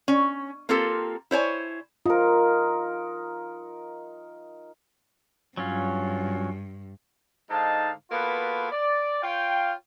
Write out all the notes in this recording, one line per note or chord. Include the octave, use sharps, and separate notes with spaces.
C#4
A#3 C4 F4 G4 A4 A#4
E4 C5 C#5 G#5
D#4 F4 A#4
G2 F#3 C#4 F4
G#2 D3 D#4 F5 A5
A#3 B3 F4 F#4 A4 B4
D5
F4 C#5 F5 G5